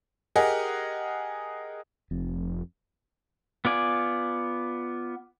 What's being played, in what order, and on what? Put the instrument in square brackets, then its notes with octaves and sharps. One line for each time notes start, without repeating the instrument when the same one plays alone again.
[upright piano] G4 G#4 A#4 D#5 F#5
[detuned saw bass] F1 [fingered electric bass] F2
[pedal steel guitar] B3 F4 D5 G#5